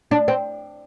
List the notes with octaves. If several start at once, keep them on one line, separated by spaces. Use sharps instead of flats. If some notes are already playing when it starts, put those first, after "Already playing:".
D4
C4